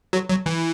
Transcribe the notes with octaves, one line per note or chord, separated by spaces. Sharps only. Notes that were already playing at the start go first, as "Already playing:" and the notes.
F#3
F#3
E3